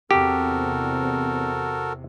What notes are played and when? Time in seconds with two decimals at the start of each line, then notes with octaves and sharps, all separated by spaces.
0.11 E2 C3 C4 F#4 G4 A4 A#4